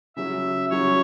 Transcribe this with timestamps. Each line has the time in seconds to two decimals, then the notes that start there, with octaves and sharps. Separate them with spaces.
0.16 C#3 F#3 C#4 E5
0.70 C#3 F#3 C#4 C#5